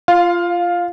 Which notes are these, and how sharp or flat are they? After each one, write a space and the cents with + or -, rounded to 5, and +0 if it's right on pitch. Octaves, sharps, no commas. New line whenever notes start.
F4 -15 F5 +10